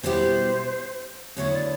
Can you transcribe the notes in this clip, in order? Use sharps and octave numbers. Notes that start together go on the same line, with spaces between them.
B2 G3 B3 E4 G4 C5
D2 D3 F#3 B3 E4 C#5
D5